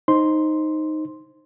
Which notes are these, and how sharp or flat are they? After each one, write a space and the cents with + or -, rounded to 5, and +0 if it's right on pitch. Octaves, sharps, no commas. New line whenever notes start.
D#4 +0 C5 +10 C6 +0